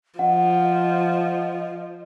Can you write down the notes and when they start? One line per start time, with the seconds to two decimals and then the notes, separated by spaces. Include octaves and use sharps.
0.19 F3 D#5 F#5